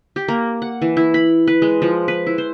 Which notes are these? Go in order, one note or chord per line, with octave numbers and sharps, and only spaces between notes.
G4
A#3
F#5
E3
E4
B5
B4
G#3
F3
B4
E4
C5